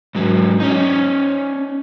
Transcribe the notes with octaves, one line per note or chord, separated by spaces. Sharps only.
G#2 F#3
C#4 D#4